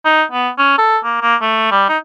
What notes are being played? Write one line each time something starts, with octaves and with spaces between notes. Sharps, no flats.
D#4
B3
C#4
A4
A#3
A#3
A3
G3
D#4